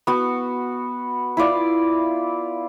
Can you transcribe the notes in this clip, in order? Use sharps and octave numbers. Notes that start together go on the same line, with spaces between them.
B3 F#4
E4 F4 D5